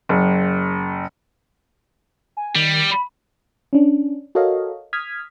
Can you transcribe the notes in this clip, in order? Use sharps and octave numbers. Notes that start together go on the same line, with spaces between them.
F#1
G#5
D#3 G3
B5
C#4 D4
F#4 A4 A#4 C#5 D#5 F5
D#6 F6 G#6 B6